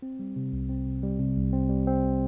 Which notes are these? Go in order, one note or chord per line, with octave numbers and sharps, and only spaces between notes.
C4
G3
C3
C2
C4
C3
G3
C3
C2
C4
G3
C4